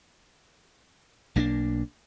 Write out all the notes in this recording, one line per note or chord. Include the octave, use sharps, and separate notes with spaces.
B1 A#3 C4 D4